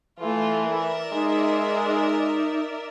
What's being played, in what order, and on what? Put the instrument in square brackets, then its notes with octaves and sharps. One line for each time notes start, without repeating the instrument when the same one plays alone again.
[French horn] E3 [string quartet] A3 F4
[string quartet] A#4 D5 E5
[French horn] G#3 [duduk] D#4
[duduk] D#4